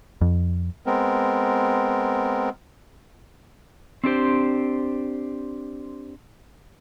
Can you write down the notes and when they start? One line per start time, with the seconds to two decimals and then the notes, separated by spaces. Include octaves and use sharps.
0.21 F2
0.86 G#3 B3 C4 A#4
4.04 C4 D4 G4 C5